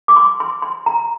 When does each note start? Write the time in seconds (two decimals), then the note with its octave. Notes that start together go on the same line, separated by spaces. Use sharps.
0.08 D6
0.16 C6
0.40 C6
0.62 C6
0.86 A#5